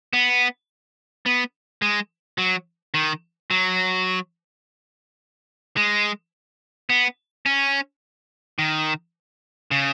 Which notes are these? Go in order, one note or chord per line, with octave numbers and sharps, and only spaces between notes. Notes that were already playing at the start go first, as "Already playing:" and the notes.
B3
B3
G#3
F#3
D#3
F#3
G#3
B3
C#4
D#3
C#3